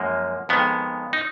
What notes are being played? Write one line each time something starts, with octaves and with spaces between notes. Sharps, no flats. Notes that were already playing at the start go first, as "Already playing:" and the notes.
Already playing: F#2 F3 G#3 A#3
F2 D#3 G#3 B3
D#4